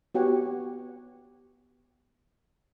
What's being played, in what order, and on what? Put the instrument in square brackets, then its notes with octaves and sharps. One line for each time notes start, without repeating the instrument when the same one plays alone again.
[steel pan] B3 F#4 G4 C#5 F#5 G#5